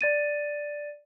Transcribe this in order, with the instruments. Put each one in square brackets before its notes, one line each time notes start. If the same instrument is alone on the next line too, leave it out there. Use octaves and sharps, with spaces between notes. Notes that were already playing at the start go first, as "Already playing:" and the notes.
[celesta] D5 A6 D#7